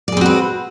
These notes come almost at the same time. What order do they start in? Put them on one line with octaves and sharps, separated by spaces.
D5 G#4 C4 F#4 B4